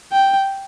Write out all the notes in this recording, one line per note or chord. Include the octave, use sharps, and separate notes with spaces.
G5